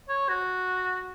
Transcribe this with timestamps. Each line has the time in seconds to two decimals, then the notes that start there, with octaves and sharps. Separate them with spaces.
0.09 C#5
0.29 F#4